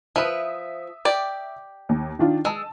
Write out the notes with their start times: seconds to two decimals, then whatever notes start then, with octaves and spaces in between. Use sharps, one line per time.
0.16 F3 B4 E5 D#6
1.05 G4 D5
1.89 D#2
2.19 D#3 D4 F4
2.45 G#3 A5 E6